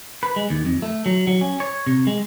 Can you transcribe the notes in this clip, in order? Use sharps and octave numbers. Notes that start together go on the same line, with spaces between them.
B4
G#3
D#2
F2
A3
F#3
F#3
C#4
C#5
C3
G#3